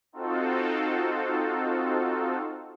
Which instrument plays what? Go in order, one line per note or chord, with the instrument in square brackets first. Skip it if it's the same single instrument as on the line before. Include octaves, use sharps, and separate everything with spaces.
[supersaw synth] C4 D#4 F4 F#4 A4